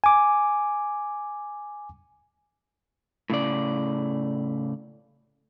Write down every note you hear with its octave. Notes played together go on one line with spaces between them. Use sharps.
G#5 D6
A2 C#3 D5